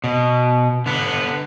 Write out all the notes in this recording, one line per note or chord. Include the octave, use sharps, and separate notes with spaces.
B2
D3 B3